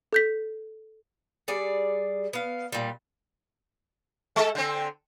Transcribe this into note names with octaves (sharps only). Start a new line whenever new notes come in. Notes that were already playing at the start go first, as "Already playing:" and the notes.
A4 G6 B6
G3 G#4 D5
B3 F5
A#2 G3
G#3 A4
D3 C4